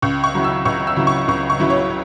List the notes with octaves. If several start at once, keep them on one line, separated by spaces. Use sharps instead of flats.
C#2 C#6
C#6
C#3 F#3 E4
E6
C#2 C#6
E6
C#3 F#3 E4
C#6
C#2 C#6
C#6
C#3 F#3 E4
C#5